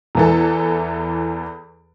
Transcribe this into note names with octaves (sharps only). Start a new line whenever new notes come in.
E2 E3 A4